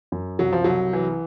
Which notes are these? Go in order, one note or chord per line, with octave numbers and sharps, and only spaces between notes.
F#2
C2 F#3
F3
C2 F#3
E3